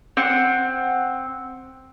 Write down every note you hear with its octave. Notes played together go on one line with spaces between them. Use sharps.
C4 F#5